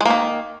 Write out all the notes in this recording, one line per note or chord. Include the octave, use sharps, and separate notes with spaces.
D#3 G#3 A#3